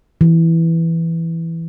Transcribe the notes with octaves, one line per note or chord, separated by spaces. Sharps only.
E3